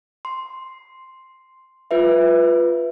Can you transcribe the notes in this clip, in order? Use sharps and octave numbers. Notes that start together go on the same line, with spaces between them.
C6
F4 B4 E5